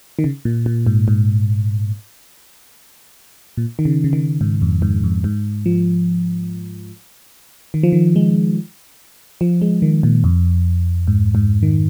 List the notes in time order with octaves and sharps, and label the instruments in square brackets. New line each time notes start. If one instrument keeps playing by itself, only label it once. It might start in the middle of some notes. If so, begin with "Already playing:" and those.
[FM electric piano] D#3
C#3
A#2
A#2
G#2
G#2
A#2
D#3
C#3
C#3
D#3
G#2
F2
G#2
F2
G#2
F3
D#3
F3
D#3
G#3
F3
G#3
D#3
A#2
F2
G#2
G#2
D#3